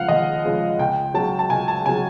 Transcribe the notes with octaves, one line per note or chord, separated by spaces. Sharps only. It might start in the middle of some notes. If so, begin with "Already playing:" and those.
Already playing: C#3 F3 G#3 F5 F#5
D#2 D#5
C#3 F3 G#3
C#2 G5
C#3 F#3 A5
A5
C#2 G#5
A5
C#3 F#3 G#5